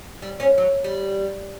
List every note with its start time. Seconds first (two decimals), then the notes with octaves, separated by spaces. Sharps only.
0.22 G3
0.40 C#4
0.58 F#3
0.84 G3